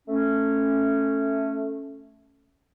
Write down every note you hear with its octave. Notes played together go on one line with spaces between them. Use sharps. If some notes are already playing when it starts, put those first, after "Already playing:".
A3 C#4